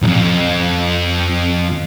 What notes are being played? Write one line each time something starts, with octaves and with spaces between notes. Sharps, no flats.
B1 F2